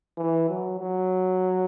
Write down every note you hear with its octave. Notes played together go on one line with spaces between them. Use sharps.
E3
F#3
F#3